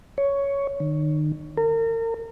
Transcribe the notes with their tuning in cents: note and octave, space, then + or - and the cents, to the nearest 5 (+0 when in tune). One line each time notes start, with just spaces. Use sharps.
C#5 +10
D#3 -40
A#4 -35